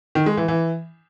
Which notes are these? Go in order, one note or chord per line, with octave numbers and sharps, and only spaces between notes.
D#3
G#3
E3
E3